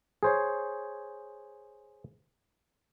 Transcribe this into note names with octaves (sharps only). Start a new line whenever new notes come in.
G#4 C5 C#5